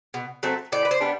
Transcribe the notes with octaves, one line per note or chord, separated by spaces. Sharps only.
B2
F#3 A3 C4
A2 D5
B4
C5
G3 B3 D4